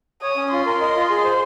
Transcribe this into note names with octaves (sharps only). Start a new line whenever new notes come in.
C#5 D#6
C#4
F4 C6
A#4
D#5
F4
G#4
C5